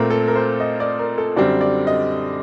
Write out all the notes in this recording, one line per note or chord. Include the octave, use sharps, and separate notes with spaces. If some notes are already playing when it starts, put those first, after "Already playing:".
Already playing: A#2 A3 C4 A#4
A4
A#4
C5
D#5
D5
A#4
A4
F#2 D3 G3 C4 D5
D5
D#5